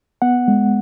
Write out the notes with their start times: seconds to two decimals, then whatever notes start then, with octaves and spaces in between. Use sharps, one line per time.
0.22 B3 F#5
0.48 G#3